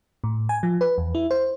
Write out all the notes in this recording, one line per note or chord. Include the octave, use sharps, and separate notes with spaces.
A2
G#5
F3
B4
E2
E4
C5